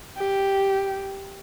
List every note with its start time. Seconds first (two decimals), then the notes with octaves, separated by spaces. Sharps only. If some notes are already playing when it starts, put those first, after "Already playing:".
0.17 G4